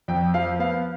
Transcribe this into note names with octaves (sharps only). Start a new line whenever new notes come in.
F2 G5
F3 F5
B3 F5